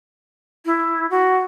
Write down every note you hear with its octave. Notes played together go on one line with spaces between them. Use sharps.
E4
F#4